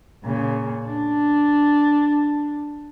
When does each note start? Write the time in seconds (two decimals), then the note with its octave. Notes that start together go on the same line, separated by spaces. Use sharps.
0.25 A#2 C#3
0.87 D4